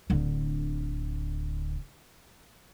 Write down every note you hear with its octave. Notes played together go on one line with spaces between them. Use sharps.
D1 D3